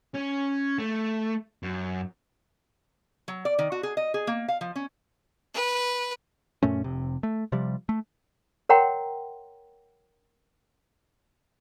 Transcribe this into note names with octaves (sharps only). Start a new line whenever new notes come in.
C#4
A3
F#2
F#3
D5
D#3
F#4
G#4
D#5
G#4
A#3
F5
F3
C#4
B4
F#2 A#2 A3 C#4
F1 C3
A3
C3 F3 G3
A3
A#4 C#5 F#5 G5 A#5 C6